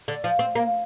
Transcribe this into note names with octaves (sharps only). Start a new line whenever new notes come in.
D3
F3
C4
A#3